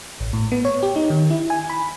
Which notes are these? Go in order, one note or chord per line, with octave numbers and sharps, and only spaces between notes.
A1
A2
B3
C#5
G4
D#4
D#3
E4
G#5
B5